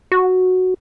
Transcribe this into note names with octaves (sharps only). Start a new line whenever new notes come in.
F#4